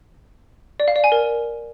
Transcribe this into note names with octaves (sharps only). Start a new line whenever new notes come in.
D5
F5
D5
G#5
A#4